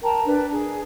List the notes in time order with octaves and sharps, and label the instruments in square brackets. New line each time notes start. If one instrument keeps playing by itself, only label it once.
[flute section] A#4 G5 A5 A#5
D4 B4
G#4